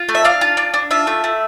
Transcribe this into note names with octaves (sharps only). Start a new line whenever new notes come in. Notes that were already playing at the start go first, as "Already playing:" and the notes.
Already playing: F4
A3
E5
D4 F5
F4
D4
D4
F4 E5
A3
A3